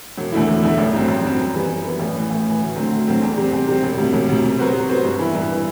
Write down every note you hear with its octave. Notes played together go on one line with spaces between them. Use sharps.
E1
E2 D3 A3 E4
E1
E2 D3 A3 E4
A1
G2 F#3 C4
A1
G2 F#3 C4
F#2
E3 G3 B3
F#2
E3 G3 B3
A1
A2 E3
A1
A2 E3
D2
D3 F#3 A3 C4
D2
D3 F#3 A3 C4
E2
C3 G3 C4
E2
C3 G3 C4
E1
D2 C3
E1
D2 C3
C3
F#3 B3 F#4 C5
C3
F#3 B3 F#4 C5
G2
E3 B3 E4
G2
E3 B3 E4